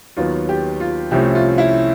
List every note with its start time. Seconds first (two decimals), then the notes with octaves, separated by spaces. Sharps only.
0.17 D#2 D#3 F#3 B3 F4
0.49 G4
0.80 F4
1.11 C2 C3 F3 A3 C#4 G4
1.35 F4
1.58 E4